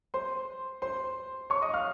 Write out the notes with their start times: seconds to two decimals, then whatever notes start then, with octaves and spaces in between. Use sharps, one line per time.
0.14 C5 C6
0.82 C5 C6
1.50 C#5 C#6
1.62 D#5 D#6
1.73 F5 F6